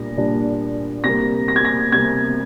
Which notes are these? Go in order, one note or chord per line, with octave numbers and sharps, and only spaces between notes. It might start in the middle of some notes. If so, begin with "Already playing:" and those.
Already playing: A#2 G3 D4 A#6
A#2 G3 D4
C3 G3 A#3 A#6
A#6
G#6
A#6
C3 G3 A#3 G#6